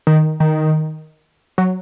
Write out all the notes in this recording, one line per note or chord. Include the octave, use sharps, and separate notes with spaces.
D#3
D#3
F#3